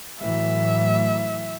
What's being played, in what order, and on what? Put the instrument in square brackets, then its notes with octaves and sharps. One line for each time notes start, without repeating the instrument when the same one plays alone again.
[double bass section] A2 E3 F#3 [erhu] E5